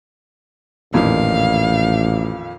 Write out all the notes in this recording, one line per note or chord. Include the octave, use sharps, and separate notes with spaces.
A1 F2 A#2 D#3 F5